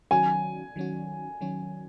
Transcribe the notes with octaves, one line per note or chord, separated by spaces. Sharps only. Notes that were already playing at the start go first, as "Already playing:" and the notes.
D#3 F#3 C#4 F#4 G#5
D#3 F#3 C#4 F#4
D#3 F#3 C#4 F#4